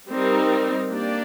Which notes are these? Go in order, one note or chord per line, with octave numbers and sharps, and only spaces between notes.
G3 C4 D#4 A#4
A#3 D4 G4 D5